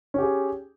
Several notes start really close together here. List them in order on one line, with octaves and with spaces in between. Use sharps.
C#4 G4 G#4